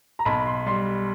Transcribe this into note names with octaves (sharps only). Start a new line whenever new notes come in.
A#5
B1 B5
C6
G3 C6